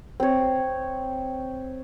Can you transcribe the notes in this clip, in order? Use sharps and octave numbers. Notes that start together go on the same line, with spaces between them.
C4 C#5